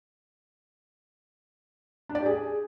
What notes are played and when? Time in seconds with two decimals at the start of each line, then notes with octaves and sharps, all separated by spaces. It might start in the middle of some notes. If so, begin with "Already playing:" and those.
2.09 D4
2.15 D5
2.20 G4
2.26 G#4